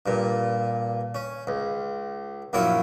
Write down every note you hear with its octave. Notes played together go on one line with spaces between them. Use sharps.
G2 A#2
C#4
C#2
A#1 F#2 E4 F4 C#5